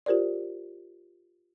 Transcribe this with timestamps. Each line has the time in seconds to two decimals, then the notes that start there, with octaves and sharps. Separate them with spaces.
0.06 F4 G4 A#4 C5 D5